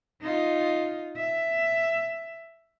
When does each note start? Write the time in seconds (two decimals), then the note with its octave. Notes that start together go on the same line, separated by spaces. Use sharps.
0.22 D#4 F4
1.17 E5